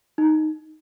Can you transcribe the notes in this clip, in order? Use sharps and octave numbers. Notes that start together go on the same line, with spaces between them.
D#4